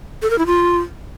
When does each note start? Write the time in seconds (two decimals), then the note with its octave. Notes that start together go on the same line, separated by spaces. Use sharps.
0.22 A4
0.30 A#4
0.38 E4
0.47 F4